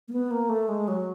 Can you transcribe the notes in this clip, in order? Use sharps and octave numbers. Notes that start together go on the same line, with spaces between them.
A#3
B3
A#3
A3
G#3
F#3